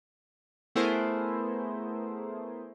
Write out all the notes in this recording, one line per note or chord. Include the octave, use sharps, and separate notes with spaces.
A3 B3 E4 G#4 A#4 C5